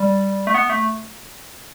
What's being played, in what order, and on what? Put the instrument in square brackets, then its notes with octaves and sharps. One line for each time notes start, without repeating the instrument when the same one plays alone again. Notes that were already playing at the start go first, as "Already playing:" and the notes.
Already playing: [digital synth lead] G3
A3
B3
A3